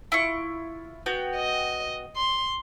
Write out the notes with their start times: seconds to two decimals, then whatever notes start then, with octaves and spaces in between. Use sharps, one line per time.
0.12 E4 F4 C#6
1.06 B3 F#4 G5
1.36 D#5
2.16 C6